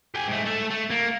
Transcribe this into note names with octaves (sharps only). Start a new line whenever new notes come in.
G4 G#5
G#2 A3
A3 A4
A3
A#3